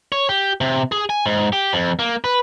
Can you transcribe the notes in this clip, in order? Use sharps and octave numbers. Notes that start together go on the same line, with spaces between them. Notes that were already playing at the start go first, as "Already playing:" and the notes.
C#5
G4
C3
G#4
G#5
G#2
G4
F2
A#3
B4